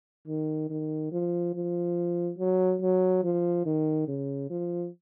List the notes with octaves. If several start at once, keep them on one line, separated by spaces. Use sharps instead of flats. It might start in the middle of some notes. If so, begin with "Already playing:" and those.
D#3
D#3
F3
F3
F#3
F#3
F3
D#3
C#3
F3